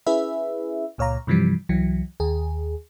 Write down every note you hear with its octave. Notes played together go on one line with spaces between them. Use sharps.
C#4 E4 G#4 B4 E5
C#2 A#2 C#5 F5 A#5
G2 C3 E3 F3 G3
C2 E3 F#3
D#2 G#4